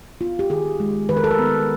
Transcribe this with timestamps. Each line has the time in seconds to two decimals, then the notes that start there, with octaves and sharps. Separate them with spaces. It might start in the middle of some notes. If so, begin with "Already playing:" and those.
0.21 B3 F4
0.39 G4
0.50 D#3 G#4
0.80 G#3
1.09 D#3 B4
1.17 A#4
1.24 A4
1.31 A#4
1.39 B3